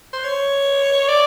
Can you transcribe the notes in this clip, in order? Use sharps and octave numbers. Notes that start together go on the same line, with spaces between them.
C5
C#5
D5